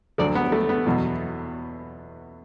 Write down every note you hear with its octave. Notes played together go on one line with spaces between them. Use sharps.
D2 D3 F#3 A4 D5
B3
A3
B3
E2 B2 F#3